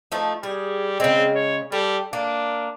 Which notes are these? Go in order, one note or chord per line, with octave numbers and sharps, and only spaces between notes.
F3 A3 D#4
G3 G#4
C#3 G#3 C4
C#5
G3 A3
A#3 D4